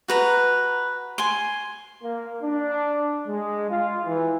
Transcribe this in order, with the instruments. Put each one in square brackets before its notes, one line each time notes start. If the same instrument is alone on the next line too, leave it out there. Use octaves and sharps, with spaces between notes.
[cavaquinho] F#4 B4 A#5
G#5 C6
[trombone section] A#3
D4
G#3
F4
E3